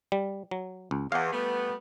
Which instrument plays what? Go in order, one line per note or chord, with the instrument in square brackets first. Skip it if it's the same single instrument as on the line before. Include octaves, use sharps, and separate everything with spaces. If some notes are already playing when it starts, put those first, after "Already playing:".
[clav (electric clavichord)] G3
F#3
C#2
[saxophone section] E2 [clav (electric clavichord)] F5 F#5
[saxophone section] G3 A3 B3